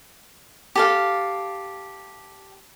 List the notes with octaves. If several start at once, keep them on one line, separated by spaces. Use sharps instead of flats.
G4 A4 F5